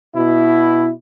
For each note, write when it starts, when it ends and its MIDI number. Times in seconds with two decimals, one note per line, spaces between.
0.15 0.89 47
0.15 0.89 64